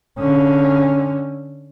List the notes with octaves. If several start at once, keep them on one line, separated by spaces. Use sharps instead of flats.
D3 C#4